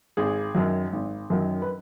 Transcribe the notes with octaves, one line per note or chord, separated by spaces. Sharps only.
G#1 G#4
F#2 D#3 F#3
G#1
F#2 D#3 F#3
B4